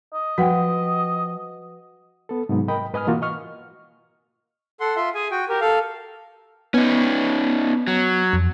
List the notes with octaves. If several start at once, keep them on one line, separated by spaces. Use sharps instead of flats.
D#5
F3 F#4 B4 F#5 G5
B3 A4
G#2 C3 F#3 B3
A#4 D#5 G5 B5
G#2 B4 D#5 G#5 D#6 F6
B2 E3 A#3 F4 F#4
D#5 C#6 F6
A4 F#5 C6
F4 E5 C6
G#4 G#5
F#4 G5
G4 A#4
A4 F5
B3 C#4 D#4
F#3
F2